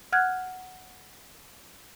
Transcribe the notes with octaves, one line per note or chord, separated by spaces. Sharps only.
F#5 F6 F#6 G#6